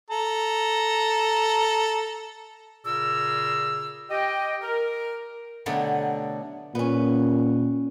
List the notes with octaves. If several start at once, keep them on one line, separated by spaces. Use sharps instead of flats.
A4 A#5
A#2 C#3 G#4 A#4 D5 E6
G4 D#5 G5
A#4
B2 D3 F#3 A3 B3 G4
A#2 B3 C#4